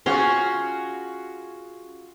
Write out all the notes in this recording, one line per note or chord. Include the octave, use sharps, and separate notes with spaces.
C#4 F4 F#4 G#4 A#5 C6